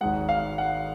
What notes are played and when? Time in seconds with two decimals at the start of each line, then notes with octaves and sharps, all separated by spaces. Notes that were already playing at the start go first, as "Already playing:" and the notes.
0.01 G#1 G#2 G#3 F#5
0.29 F5
0.58 F#5